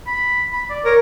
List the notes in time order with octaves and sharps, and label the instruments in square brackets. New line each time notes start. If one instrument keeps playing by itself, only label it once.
[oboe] B5
B5
D5
[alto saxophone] A#4 [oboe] C#5